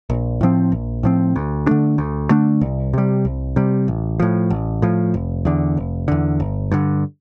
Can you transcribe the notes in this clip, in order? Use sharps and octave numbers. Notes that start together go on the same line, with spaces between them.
A#1
A2 F3 C4
A#1
A2 F3 C4
D2
D3 A3 D4
D2
D3 A3 D4
C2
C3 G3
C2
C3 G3
A1
A2 F3
A1
A2 F3
F1
E2 D3
F1
E2 D3
G1
G2 D3